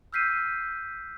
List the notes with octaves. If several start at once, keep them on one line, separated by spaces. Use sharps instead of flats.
E6 F6 G6 B6 C7 D#7